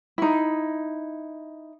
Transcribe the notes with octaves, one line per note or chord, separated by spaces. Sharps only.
D#4 E4